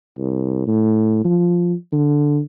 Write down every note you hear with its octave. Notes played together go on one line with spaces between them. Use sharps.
C2
A2
F3
D3